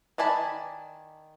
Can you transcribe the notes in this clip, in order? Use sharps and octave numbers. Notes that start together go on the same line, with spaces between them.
D#3 D5 G#5 A5 B5